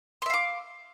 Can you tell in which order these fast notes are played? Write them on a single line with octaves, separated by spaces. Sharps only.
C6 E5 F5 D6